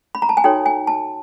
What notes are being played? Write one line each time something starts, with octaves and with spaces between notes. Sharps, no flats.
B5
A#5
A5
G#5
D#4 F#4 A4 C#5 G5
G#5
A5